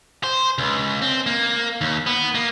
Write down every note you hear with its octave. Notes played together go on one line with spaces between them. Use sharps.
C5
C#2
C4
A#3
D#2
B3
A#3